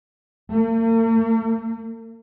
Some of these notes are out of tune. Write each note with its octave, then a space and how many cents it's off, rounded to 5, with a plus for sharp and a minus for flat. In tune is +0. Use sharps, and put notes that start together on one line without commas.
A#3 -45